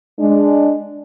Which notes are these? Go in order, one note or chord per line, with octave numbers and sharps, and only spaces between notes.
G#3 D4